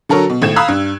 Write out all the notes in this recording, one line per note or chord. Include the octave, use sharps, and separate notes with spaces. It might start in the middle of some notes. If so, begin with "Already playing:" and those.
D3 F#3 A4 A#4 C#5
B2
G#1 A2 G#6 E7
F5 A#5 B5 D#6 E6 F#6
G2